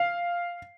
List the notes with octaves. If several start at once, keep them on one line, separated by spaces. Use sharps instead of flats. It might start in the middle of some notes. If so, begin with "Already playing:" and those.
Already playing: F5